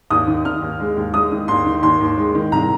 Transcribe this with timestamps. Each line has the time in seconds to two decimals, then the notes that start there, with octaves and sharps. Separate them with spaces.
0.10 D#2 D#6
0.27 D#3
0.45 D#3 F6
0.62 D#2
0.80 G#3
0.97 D#2
1.14 G#3 D#6
1.32 D#3
1.48 D#2 C6
1.66 D#3
1.83 D#2 C6
2.01 D#2
2.18 G#3
2.35 D#3
2.52 C2 A#5